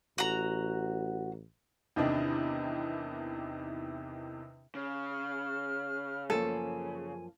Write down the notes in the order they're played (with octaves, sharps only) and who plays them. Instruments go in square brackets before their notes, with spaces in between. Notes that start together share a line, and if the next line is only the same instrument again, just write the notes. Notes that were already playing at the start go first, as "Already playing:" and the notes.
[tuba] A1 [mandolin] F#4 A#5
[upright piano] E2 C3 D#3 D4 D#5
[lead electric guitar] C#3 [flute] F6
[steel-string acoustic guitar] F#2 F3 A#3 [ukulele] A4 [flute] G#5